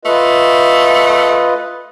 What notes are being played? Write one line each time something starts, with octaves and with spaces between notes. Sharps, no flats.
A3 F4 B4 D#5